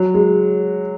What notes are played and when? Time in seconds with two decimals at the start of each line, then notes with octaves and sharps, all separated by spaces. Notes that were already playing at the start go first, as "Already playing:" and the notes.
Already playing: F#3
0.14 G#3